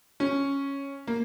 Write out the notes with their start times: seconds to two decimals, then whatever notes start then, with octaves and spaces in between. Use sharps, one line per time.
0.20 C#4
1.07 A#3